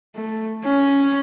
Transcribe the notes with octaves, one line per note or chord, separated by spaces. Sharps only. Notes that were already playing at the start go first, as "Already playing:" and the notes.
A3
C#4